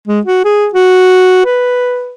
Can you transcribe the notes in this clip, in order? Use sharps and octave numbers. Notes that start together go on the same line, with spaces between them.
G#3
F#4
G#4
F#4
B4